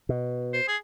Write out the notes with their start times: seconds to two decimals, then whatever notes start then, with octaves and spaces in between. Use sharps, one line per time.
0.09 B2
0.53 C5
0.68 G#4